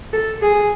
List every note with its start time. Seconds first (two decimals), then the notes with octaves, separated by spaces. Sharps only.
0.13 A4
0.42 G#4